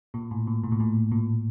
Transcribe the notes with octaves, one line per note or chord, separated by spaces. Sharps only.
A#2
A2
A#2
A2
A#2
A2
A#2